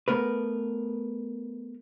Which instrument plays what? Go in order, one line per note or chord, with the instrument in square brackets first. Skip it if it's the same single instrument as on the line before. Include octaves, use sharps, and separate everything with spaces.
[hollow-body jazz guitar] A3 B3 A#4 B4